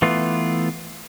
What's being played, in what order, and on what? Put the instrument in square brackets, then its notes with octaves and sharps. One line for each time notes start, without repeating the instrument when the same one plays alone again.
[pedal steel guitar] E3 A3 B3 F4